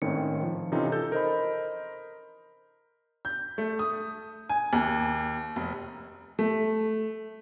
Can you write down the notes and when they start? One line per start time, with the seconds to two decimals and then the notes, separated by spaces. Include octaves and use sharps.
0.02 G#1 A2 D#3 C4 C#4 C#7
0.43 F3
0.72 C3 E3 C#4 D#4 F4 A4
0.92 A4 G6
1.12 A#4 C5 D#5 B5
3.25 G6
3.58 A3
3.79 D#6
4.49 G#5
4.73 D#2
5.56 F1
6.39 A3